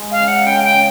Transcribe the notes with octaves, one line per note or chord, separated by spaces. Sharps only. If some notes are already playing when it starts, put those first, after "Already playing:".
Already playing: G#3
F5
C#3
F#5
C#3 G5
G5
C#3